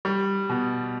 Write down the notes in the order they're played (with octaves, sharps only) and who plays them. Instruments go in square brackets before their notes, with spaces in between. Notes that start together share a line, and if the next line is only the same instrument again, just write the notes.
[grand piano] G3
B2